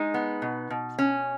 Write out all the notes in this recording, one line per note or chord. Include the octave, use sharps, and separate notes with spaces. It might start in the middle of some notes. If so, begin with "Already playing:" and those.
Already playing: G#3 D#4
B3
B2
B2
C#4